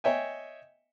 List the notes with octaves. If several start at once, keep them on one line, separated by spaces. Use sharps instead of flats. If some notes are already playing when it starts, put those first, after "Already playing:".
C#5 D#5 E5 G5 G#5